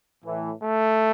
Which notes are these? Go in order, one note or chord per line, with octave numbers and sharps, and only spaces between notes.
A2 E3
A3